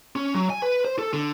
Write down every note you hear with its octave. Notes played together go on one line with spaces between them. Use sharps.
C#4
F#3
G#5
B4
C5
A4
D3